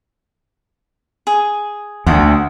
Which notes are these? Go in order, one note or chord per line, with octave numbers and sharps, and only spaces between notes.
G#4
D2 C5 F#5 G5